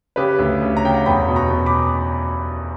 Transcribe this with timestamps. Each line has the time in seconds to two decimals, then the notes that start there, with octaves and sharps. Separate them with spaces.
0.16 C#3 G4 B4
0.39 D2
0.62 C#3
0.77 A#5
0.85 C#3 G5
0.94 F#5 A#5
1.06 E2 G5 B5
1.29 B2
1.36 A#5 C#6
1.51 B2
1.66 B5 D6